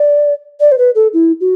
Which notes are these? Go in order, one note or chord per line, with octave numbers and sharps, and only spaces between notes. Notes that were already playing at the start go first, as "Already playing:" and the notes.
Already playing: D5
D5
C5
B4
A4
E4
F#4